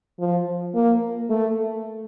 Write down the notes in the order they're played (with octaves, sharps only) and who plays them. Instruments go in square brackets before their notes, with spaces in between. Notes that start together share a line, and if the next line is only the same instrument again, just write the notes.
[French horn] F3
A#3
A3